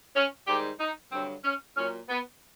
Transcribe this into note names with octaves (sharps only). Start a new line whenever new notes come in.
C#4
G#2 D#3 G3 G4
D#4
G2 D3 F#3 C4
C#4
A#2 F#3 C#4
B3